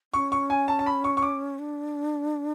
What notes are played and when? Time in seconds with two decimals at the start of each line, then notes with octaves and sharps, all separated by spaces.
0.14 C#4 C#6
0.32 C#6
0.50 G#5
0.68 A5
0.79 A5
0.86 B5
1.04 C#6
1.17 C#6
1.22 D6
1.59 D4